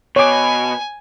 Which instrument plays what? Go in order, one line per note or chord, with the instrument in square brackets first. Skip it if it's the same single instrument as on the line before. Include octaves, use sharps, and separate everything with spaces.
[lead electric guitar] B2 [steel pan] C#5 D6 [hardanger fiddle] G#5